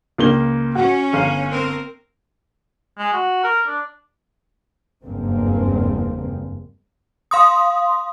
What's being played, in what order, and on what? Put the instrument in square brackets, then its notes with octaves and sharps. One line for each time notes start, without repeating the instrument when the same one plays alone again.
[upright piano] C#2 A#3 G7
[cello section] C#4 [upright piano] F#4
[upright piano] G1 F5 D#7
[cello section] C4 A#4
[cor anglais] G#3
F#4
A#4
D4
[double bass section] F#1 E2 G2 G#3 A#3 C4
[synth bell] F5 C6 D#6